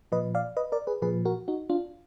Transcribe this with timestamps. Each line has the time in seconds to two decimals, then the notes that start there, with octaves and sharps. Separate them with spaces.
0.12 A#2 F3 B4 D#5
0.35 D5 F5
0.57 B4 D#5
0.72 A#4 D5
0.87 G#4 B4
1.02 A#2 F3 G#4 B4
1.25 F#4 A#4
1.48 D#4 F#4
1.70 D4 F4